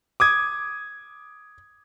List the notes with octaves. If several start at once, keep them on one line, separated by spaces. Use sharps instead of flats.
D6 D#6 G#6